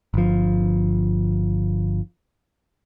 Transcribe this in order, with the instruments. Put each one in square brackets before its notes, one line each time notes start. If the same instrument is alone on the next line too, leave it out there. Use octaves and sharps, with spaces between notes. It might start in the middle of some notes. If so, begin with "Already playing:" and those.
[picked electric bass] G1 F3